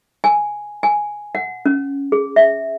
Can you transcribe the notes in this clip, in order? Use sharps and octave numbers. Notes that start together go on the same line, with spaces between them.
G#5
G#5
F#5
C#4
G#4
E5